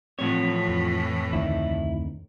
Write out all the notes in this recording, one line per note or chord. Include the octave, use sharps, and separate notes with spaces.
A2 E3 F3 C4 C#5
F2
D2 D#3 E4